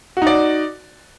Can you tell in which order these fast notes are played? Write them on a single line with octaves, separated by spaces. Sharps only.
F#4 D#4 D5